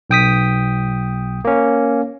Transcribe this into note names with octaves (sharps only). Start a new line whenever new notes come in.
B1 G5 D#6 B6
A#3 C#4